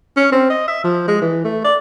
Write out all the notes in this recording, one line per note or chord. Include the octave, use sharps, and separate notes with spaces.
C#4
C4
D#5
E5
F3
G#3
E3
A3
D5